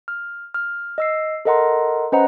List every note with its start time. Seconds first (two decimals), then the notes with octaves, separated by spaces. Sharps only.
0.08 F6
0.54 F6
0.98 D#5 E6 C7
1.45 A4 A#4 D#5 F#5 A#5 C6
2.12 C#4 B4 C5 D#5 F#5 A#5